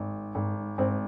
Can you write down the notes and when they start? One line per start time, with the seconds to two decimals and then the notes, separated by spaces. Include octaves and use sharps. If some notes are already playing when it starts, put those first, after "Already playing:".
Already playing: G#1
0.35 G#1
0.78 G#1 C4